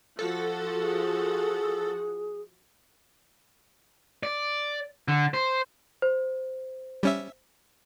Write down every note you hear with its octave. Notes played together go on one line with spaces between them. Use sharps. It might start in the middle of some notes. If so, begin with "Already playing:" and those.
F3 F#4 A4 F#5
G#4
D5
D3
C5
C5
G3 C#4 E5